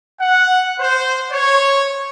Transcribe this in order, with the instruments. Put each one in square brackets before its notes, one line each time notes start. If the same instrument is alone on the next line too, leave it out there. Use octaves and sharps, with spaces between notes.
[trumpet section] F#5
C5
C#5